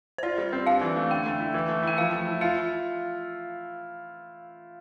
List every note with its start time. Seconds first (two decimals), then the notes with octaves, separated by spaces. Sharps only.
0.18 C5
0.23 F4 D5
0.38 G3
0.53 C4
0.66 D4 F5
0.81 E3
0.96 A3
1.10 D3 G5
1.25 A3
1.40 E4
1.54 E3
1.68 A3
1.83 E4 G5
1.98 F3 F5
2.12 A3
2.27 E4
2.41 F4 F5